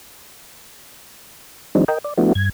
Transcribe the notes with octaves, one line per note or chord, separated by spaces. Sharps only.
E3 F#3 G#3 C4 D4 D#4
A#4 D#5 G5
D5
F3 A3 B3 D4 E4 F#4
G2 G#6